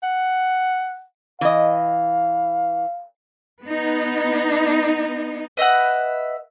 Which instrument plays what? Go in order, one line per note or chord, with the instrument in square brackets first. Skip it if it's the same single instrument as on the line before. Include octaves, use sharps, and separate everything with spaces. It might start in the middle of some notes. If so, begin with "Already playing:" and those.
[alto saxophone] F#5
[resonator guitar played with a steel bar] E3 D#5 [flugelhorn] F5
[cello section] B3 D#4
[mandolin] B4 D#5 E5 F#5